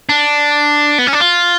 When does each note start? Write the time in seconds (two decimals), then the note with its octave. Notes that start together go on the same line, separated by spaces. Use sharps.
0.09 D4
0.99 B3
1.07 C#4
1.13 D4
1.20 F4